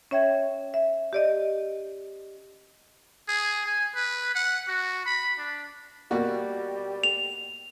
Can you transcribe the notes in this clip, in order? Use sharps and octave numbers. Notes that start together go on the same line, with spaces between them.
C#4 C#5 E5 G5 G#6
E5
G4 D5 D#5
G#4
G#5
B4
F#5
F#4
B5
D4
B2 G3 A#3 F#4
F7